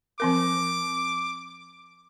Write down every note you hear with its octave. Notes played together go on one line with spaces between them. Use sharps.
F3 C4 A#4 D6